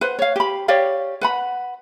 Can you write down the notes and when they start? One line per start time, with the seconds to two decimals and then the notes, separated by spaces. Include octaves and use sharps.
0.01 B4 C5 F#5
0.19 C#5 F5
0.36 G4 B5
0.68 G4 C#5 D5 F5
1.21 B4 F#5 B5